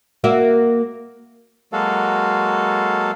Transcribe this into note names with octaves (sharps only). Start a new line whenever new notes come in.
A#3 F#4 E5
F#3 G#3 A#3 F#4 A4 F5